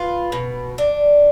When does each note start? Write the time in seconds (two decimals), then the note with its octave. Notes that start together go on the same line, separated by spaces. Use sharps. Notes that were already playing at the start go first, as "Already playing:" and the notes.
Already playing: F4 B4
0.32 B2
0.78 D4